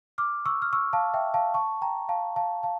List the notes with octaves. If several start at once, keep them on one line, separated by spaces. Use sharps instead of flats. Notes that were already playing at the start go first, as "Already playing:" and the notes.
D6 F6
C#6 E6
F6
C#6 E6
F5 A5
E5 G5
F5 A5
A5 C#6
G5 A#5
F5 A5
F5 A5
F5 A5